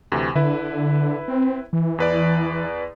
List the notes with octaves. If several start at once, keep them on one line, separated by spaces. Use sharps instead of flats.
D2 C3 E3
D3 E4 B4 E5
C4
E3
E2 B4 D5